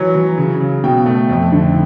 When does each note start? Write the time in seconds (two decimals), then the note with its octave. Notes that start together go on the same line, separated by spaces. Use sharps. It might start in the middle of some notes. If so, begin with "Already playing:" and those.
Already playing: E3 F#3 C#5
0.15 F#3
0.38 C#3
0.61 C#3
0.84 B2 G5
1.06 A3
1.29 F2
1.52 D3